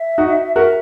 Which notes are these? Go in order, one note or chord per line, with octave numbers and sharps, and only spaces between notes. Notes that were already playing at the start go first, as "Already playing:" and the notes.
Already playing: E5
D#4 F#4
F#4 A#4 E5